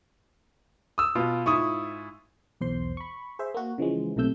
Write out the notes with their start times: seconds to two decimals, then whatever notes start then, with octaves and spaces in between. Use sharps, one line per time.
0.98 D#6 E6
1.15 B2 F4
1.46 G#2 E4 F4 C#6 D#6
2.61 B1 E2 C5 C6
2.97 B5 C#6
3.39 G#4 C5 E5
3.54 A#3 F#4
3.78 C#3 E3 F3 G#3
4.16 B1 A2 C3 A3 E6 G6